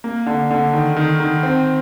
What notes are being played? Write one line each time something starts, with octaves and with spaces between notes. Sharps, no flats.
A#3
D3
D3
D#3
D#3
D#3
C4